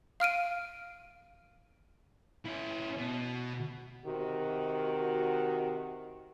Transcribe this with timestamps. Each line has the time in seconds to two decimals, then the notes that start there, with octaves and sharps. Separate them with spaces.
0.20 F5 F6 D7 D#7
2.45 C#4 E4
2.97 B2
4.06 C3 D#3 F#4